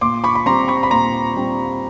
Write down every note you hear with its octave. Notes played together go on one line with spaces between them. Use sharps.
A#2 C6 D6
B5 C#6
B5
G3 C4 A#5 C6
B5 C#6
B5
A#2 A#5 C6
G3 C4